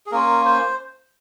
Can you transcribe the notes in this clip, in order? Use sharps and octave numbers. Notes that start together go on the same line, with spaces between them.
G#4
A#3 C#4 F4 A#4
C5